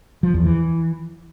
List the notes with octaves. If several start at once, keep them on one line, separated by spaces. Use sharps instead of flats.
F3
E2
E3